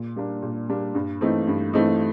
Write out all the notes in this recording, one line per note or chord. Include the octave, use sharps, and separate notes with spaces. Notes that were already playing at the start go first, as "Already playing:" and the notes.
Already playing: A#2
G3 A#3 D4
A#2
G3 A#3 D4
G2
E3 A3 C4 D#4
G2
E3 A3 C4 D#4